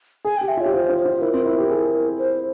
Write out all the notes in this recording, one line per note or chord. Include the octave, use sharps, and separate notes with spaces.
G#4 G#5
G4 G5
E5
F4
G4 C#5
F4 C5
F4
C5
F4
E4 A#4
C4
E4
G4
G#4
C5